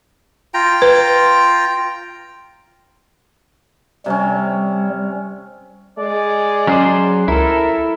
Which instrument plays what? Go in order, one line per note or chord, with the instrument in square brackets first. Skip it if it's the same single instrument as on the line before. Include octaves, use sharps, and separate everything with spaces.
[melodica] F4 G5 A#5
[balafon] B4
[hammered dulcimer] C3 C4 C#4 [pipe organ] G3
[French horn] G#3 [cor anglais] D5
[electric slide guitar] F#3 G#4 C5 [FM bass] C#4
[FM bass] C#2 [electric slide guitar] E4 A4 [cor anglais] A#4